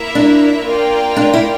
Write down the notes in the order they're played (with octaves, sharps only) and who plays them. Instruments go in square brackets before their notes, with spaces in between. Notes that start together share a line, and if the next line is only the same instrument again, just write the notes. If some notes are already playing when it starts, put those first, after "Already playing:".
Already playing: [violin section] A#3 E4 A#4 E5
[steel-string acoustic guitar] D4
[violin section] A#3 F4 A#4 D5 G5
[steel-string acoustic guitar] D4
E4